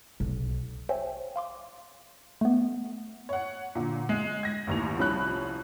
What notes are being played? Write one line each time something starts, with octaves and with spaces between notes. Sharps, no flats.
B1
C5 C#5 E5 G5 G#5
F5 C6 D6
A3 B3
C#5 F#5
A#2 D3
G#3
G#6 A#6
A1 D#2 F7
C2 F3 C#4 B5 F#6